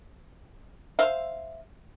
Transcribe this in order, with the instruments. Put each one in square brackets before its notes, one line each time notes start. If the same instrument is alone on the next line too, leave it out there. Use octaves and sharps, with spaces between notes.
[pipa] C5 E5 F5